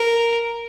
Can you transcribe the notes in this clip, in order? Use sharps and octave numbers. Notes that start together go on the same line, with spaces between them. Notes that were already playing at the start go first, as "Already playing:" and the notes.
Already playing: A#4